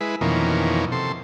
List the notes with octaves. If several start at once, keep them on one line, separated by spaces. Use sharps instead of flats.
G#3 E4 B4
F2 B2 D#3 E3 A#3 C#4
C3 A4 C6